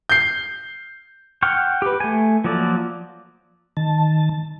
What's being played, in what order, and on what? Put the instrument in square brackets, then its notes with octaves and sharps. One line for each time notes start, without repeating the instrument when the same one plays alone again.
[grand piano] G6 C7
[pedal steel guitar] F#5 G5 C#6 F6
G4 B4
A3 G#5
F3 F#3 A#3 D5
[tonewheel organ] D#3 A5